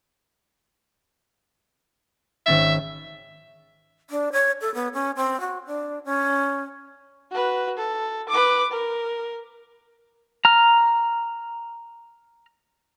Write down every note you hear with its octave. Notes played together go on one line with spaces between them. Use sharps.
G#1 C#4 E5 A6
D4
C#5
A4
B3
C#4
C4
F#4
D4
C#4
F#4 B4
A4
B4 D6
A#4
A#5 F6